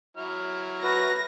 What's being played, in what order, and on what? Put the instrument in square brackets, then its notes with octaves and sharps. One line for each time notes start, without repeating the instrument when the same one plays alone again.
[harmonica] F#3 E4 F6
[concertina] F#4 B4 [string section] A#6